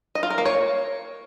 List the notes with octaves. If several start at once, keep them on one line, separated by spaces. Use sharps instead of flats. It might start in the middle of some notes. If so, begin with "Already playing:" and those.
D#5
F4
A#4
A#3
C#5